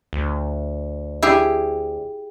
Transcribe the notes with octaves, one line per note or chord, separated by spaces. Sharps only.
D2
E4 G4 G#4